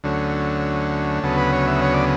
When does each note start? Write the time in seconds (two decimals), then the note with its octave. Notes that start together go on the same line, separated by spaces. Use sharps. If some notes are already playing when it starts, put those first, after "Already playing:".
0.04 D2 D3 F#3 A3 C#4
1.23 D2 C#3 F#3 B3 A4
1.38 B4
1.53 C#5
1.67 E5
1.82 C#5
1.94 D5